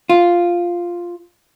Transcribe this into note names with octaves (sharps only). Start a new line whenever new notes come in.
F4